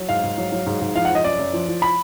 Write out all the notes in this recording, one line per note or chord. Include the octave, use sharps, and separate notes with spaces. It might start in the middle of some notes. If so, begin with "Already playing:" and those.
Already playing: F#3
G#2 F5
G#2
F#3
F#3
G#2
G#2
F3 F5
F#5
F3 D#5
F#2 D5
F#2
F3
F3
B5